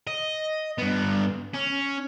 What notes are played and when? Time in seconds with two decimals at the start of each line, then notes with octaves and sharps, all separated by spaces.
0.07 D#5
0.78 G2 B3
1.54 C#4